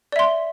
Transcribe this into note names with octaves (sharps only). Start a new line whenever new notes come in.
D5 E5 C6